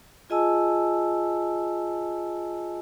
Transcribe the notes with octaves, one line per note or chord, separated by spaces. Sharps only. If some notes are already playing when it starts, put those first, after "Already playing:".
F4 G#4 D#5 G#5 A5 E6